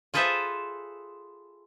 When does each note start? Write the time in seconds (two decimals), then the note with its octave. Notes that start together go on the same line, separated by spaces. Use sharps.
0.14 F4 G#4 A4 B4 C5 E5